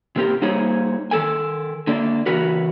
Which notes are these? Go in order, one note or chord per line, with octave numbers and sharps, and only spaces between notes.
C3 A#3 C4 G4 A#4
G3 A#3 D#4 G#4 C5 C#5
D#3 F#3 A4 A#4 G#5
D3 A#3 D5
C#3 E3 F#4 A#4 B4